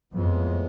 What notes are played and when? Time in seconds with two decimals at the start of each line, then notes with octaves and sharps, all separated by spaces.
0.13 F2 A2 E3 G#3 B3